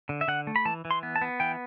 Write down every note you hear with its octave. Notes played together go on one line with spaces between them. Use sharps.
D3
E5
D3 F#5
A3
B5
E3 A5
E3
C6
B3
A5
B3
E3 G5